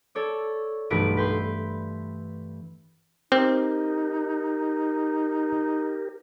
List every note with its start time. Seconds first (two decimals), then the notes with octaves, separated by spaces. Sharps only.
0.15 A4 C#5 D5
0.90 B1 G2 E3 A3 B4 D7
1.17 B4 G5 C6
3.32 C4 D#4 G4 A#4